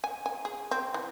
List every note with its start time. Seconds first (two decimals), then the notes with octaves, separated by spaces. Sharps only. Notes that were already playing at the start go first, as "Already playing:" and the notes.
0.04 G#5
0.26 G#5
0.45 G#4
0.71 C4
0.94 E3